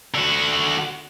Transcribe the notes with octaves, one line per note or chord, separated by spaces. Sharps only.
D3 F#4